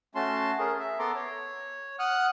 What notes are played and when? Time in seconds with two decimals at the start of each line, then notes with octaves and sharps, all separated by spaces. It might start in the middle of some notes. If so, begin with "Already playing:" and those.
0.15 A3 C#4 F#4 A5 C6
0.59 C#4 G#4 A#4
0.79 E5
0.99 B3 A4 A#5 C6 D6
1.15 C#5
1.99 F#5 D#6 F6 F#6